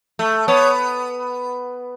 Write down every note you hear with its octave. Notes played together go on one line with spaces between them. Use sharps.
A3
B3 C#5